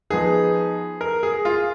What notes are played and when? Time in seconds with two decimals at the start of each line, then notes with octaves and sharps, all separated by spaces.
0.10 F3 B3 D#4 G#4
1.01 A#4
1.23 G#4
1.45 F4